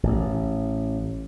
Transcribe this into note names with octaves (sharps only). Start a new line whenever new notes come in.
A1